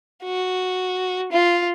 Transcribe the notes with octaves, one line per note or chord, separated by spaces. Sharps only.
F#4
F4